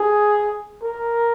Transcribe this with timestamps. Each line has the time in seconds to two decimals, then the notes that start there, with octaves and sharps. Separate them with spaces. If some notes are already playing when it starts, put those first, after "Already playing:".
Already playing: G#4
0.82 A#4